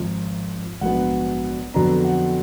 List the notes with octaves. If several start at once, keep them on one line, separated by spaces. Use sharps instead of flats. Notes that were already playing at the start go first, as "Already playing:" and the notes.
Already playing: G#1 G#2 F3
A#1 G#2 F#3 B3 D4 F#5
F2 D3 F#3 B3 D4 A#5
F#5